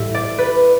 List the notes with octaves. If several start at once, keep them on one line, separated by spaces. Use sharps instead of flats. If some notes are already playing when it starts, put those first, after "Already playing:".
Already playing: A2 G3 E5
D5
B4